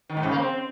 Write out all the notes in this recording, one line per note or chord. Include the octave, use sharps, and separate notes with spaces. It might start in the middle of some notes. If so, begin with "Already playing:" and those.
D#3
G#2
C#3
A#3
C4